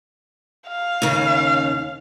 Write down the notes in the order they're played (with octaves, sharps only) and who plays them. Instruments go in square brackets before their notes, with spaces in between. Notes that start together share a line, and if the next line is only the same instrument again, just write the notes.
[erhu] F5
[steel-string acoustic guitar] D#2 C#3